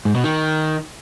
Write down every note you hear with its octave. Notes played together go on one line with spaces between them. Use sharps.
G#2
B2
D#3